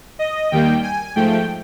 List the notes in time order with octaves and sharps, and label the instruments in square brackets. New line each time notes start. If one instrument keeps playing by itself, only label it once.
[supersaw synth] D#5
D#2 D#3 G3 A#3 G5
G#5
G#2 F3 A3 G5